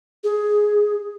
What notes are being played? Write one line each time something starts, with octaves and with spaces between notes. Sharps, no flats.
G#4